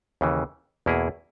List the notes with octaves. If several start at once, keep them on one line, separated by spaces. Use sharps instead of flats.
D#2 C#3 E3
E2 B2 A#3 E4 G#4